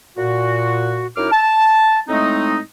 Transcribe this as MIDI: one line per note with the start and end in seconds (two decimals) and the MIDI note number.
0.18 1.08 46
0.18 1.08 66
1.17 1.28 42
1.17 1.28 63
1.17 1.28 64
1.17 1.28 86
1.17 1.28 89
1.31 2.00 81
2.09 2.58 45
2.09 2.58 56
2.09 2.58 57
2.09 2.58 60
2.09 2.58 63